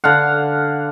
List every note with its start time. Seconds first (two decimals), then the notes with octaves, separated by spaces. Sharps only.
0.04 D3 F5 F#5